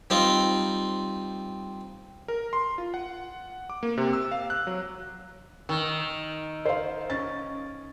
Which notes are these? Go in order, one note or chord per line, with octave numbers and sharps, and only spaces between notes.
G3 C4 D#4 F4
A#4
C6
F4
F#5
D6
A#3
C3
E6
F5
F#6
F#3
D#3 E6
C5 F5
C#4 A6